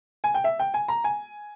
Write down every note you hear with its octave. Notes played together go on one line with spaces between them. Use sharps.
G#5
G5
E5
G5
G#5
A#5
G#5